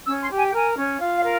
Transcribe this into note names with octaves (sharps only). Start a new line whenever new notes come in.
C#4 E6
C6
G4
G#5
G5
A#4 G#5
C#4
F4
F5
A#4